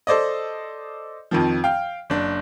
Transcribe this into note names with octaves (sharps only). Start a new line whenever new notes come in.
A4 C5 D5 D#5
F2 D#3 F3
F5 G5
F#1 D4